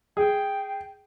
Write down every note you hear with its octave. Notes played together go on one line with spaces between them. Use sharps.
G#4 G5